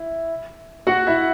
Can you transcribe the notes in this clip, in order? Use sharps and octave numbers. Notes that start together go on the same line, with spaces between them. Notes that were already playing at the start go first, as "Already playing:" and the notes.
Already playing: E4
F#4 F#5
E4 E5